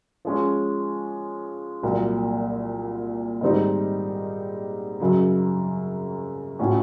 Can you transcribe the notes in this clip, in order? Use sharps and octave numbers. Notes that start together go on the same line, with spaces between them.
F3 G#3 C#4
C2 A#2 F#3 A#3
G#2 D#3 G3 C4 D#4
F#2 C#3 F#3
A2 F3 A3 C#4 F#4